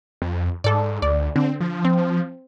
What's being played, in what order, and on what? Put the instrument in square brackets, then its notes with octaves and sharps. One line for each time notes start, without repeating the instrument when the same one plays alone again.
[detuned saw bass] F2
[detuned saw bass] G#2 [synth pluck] A4 D5
[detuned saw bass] D2 [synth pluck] D5
[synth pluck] D3 [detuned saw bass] C4
[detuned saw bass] F3
[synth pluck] C4